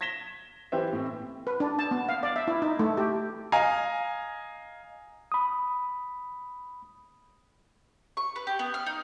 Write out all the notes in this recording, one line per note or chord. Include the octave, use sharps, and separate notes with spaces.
G#6 A#6 B6 E7 G7
E3 G4 B4 C5 E5
A2 C4
B4
D4
A5
B3
F5
D5
E5
E4
D#4
A3
G4
D#5 F5 G#5 A#5
B5 D#6
C#6
B4
G4
B3
F6
D#4